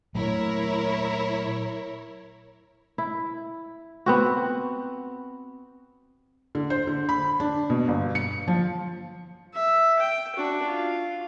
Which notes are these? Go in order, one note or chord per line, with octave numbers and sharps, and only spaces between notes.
A#2 F#3 A3 E4 A#4 C#5
E4
B3 C4 F#4
D3
C5
D3
B5
D4
B2
G1
C#7
F3
E5
G5
D4 F#4
F4